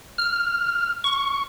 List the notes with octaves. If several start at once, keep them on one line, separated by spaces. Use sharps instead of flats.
F6
C#6